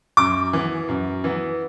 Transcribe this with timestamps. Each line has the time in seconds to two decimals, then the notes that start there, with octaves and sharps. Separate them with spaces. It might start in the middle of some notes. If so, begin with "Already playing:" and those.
0.17 F#2 D6
0.53 E3 B3
0.89 F#2
1.24 E3 B3